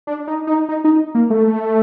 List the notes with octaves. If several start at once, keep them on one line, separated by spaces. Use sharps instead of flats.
D4
D#4
D#4
D#4
D#4
A#3
A3